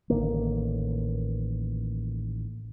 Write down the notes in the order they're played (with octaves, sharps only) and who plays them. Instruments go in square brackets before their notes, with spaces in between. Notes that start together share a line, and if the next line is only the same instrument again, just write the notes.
[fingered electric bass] A1 D3 D#3 A#3